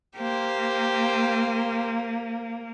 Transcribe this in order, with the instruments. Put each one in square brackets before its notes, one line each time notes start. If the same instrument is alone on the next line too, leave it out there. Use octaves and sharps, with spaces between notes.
[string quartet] A#3 [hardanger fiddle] G4 C5